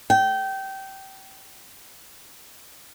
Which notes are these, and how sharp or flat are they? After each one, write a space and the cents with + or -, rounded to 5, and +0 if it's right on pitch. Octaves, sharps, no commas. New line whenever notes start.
G5 -20